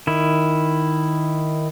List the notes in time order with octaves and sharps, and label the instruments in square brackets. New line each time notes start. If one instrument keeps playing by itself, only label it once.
[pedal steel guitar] D#3 E4